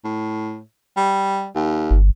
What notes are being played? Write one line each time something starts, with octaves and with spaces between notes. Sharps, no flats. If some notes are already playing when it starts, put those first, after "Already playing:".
A2
G3
D#2
G1